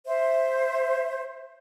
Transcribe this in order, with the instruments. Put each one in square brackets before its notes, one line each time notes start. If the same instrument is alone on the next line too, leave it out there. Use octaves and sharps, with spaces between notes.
[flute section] C5 E5